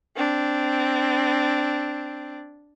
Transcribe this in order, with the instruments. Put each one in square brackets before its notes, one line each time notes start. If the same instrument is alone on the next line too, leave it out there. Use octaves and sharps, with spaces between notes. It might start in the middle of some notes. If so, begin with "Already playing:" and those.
[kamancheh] C4 D4